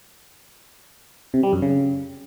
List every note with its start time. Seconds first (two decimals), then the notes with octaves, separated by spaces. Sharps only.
1.34 C3
1.43 G3
1.53 F#2
1.62 C#3